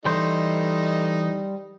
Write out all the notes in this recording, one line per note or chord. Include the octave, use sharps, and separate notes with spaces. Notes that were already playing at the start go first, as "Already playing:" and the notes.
E3 G3 A3 D#4 C5 D#5